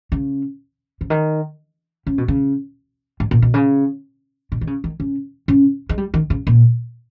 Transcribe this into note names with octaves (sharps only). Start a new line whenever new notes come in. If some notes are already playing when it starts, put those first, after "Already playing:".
C#3
C#3
D#3
C#3
B2
C#3
G#2
A#2
B2
C#3
B2
D#3
C#3
D#3
C#3
C#3
G#3
G3
D#3
C#3
A#2